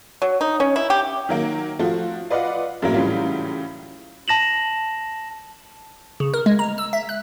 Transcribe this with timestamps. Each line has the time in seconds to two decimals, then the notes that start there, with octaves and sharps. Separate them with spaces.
0.22 F#3
0.41 D#4
0.60 C#4
0.76 E4
0.90 G4
1.29 D#3 F#3 A#3
1.79 F3 A3 F4 F#4
2.30 F4 B4 D5 D#5 F5 F#5
2.82 F#2 A2 E3 F#3 A#3
2.94 A2 C#3 E3 F#3 G3 F4
4.28 A5 A#6 E7 F#7
6.20 C#3
6.34 A#4
6.46 G#3
6.59 A#5
6.78 E6
6.93 E5
7.09 F#6